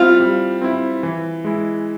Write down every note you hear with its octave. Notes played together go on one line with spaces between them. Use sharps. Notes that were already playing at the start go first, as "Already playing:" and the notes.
Already playing: G3 C4 E4 F4
G3
C4 E4
E3
G#3 E4